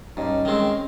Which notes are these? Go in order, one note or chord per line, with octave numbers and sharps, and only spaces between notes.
G2 C#4 D#4
D#3 G#3 C4